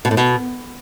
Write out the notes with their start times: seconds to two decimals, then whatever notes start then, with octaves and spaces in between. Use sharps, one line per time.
0.05 B2
0.11 A2
0.17 B2